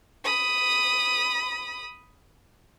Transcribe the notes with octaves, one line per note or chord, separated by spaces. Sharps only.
B5 D#6